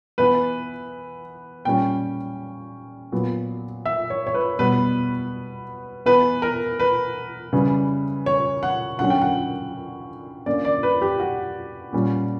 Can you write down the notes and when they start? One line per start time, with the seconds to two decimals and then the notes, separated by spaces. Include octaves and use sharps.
0.18 E3 B3 B4
1.65 A#2 G3 C#4 G5
3.12 A#2 F#3 B3
3.86 E5
4.10 C#5
4.27 C#5
4.34 B4
4.59 B2 G3 B3 B4
6.06 E3 B3 B4
6.42 A#4
6.79 B4
7.53 C#3 E3 G3
8.26 C#5
8.63 F#5
8.99 D3 F#3 C#4 F#5
9.10 G5
9.21 F#5
10.46 D3 A#3 C#4 D5
10.65 D5
10.83 B4
11.02 G4
11.20 F#4
11.93 A#2 G3 C#4